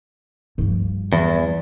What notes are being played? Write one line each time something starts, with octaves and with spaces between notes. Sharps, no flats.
G2 F3
E2